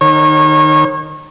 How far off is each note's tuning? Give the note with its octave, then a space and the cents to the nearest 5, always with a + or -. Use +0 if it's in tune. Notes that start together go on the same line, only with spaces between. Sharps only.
D#3 -20 C#5 -30